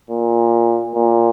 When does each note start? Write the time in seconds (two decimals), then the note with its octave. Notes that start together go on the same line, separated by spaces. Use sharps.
0.10 A#2
0.94 A#2